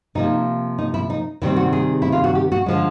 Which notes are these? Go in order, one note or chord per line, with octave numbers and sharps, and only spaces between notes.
C3 F3 A#3 D#4
D#4
E4
D#4
C3 D#3 G3 C4 E4
F#4
G#4
E4
F4
F#4
G4
F#4
D3 F3 G#3